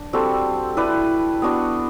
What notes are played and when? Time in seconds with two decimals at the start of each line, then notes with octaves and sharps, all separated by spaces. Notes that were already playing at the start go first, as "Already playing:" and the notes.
Already playing: D4
0.13 G3 C4 F#4 A4
0.77 E4 B4 D5
1.42 B3 D4 F#4